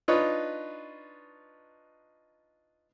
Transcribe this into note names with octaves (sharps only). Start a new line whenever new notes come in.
D4 D#4 F4 B4 C#5 D#5